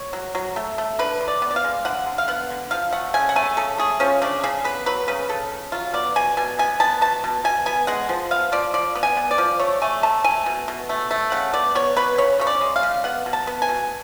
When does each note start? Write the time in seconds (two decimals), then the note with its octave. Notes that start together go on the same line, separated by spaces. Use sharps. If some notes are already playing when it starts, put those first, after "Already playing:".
Already playing: C#5
0.13 F#3
0.35 F#3
0.56 A3
0.78 A3
0.99 D3 B4
1.21 D3
1.28 D5
1.42 B3
1.51 D5
1.56 F5
1.64 G#3
1.85 D3 F#5
2.07 D3
2.18 F5
2.28 B3 F#5
2.50 D3
2.71 F3 F5
2.93 A3 F#5
3.14 C#3 G#5
3.29 F#5
3.36 A3 G#5
3.57 C#3 A4
3.78 A3 G#4
4.00 F3 C#4
4.22 C#3 D4
4.44 C#3 G#4
4.64 B3 B4
4.86 F#3 B4
5.08 C#3 B4
5.29 C#3 A4
5.52 C#3
5.72 F#3 F4
5.94 B3 D5
6.16 B2 G#5
6.37 B2 G#5
6.59 B3 G#5
6.80 B3 A5
7.01 B2 A5
7.24 B2
7.44 B2 G#5
7.66 B3 G#5
7.87 G#3 F#5
8.09 F3
8.31 B3 F5
8.52 F3 D5
8.74 F3 D5
8.95 B3
9.03 G#5
9.17 B3
9.31 D5
9.38 F3
9.60 A3 C#5
9.82 A3 G#5
10.03 A3 A5
10.24 A3 G#5
10.46 B2
10.68 B2
10.89 A3
11.11 A3
11.32 C#3 F#5
11.54 B3 D5
11.75 B3 C#5
11.96 B3 B4
12.18 C#3 C#5
12.40 C#3 C#5
12.47 D5
12.61 G#3
12.76 F5
12.83 C#3
13.04 B3 F#5
13.26 B2
13.33 A5
13.47 B3
13.62 G#5
13.69 B2